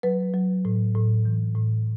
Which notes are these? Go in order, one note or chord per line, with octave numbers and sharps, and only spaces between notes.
F#3 B4
F#3
A2
A2
E3
A2